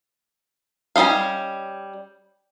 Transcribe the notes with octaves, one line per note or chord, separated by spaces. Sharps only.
G3 C#4 F4 D#5 F5